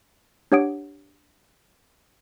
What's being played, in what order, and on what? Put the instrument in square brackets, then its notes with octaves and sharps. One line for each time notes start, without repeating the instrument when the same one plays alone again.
[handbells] D4 G4 C#5 F#5 D#6 D7